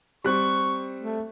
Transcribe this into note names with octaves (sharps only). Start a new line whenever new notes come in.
G3 C4 C#6 F#6
A3